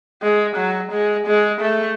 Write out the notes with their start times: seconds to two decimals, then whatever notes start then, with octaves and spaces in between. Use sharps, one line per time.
0.22 G#3
0.56 F#3
0.92 G#3
1.27 G#3
1.61 A3